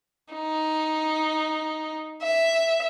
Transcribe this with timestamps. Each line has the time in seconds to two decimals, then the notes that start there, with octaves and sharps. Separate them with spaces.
0.34 D#4
2.22 E5